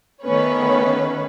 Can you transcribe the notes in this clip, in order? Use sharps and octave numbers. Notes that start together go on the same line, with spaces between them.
D#3 A3 B3 C#4 B4 C#5